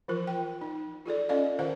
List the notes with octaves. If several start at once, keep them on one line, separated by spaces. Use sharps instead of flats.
E3 F3 F4 A#4
G5
D#4
F4 G#4 A4 D5
C#4 A4 D5 D#5 F5
D#3 F4 A#4 C5 F5 F#5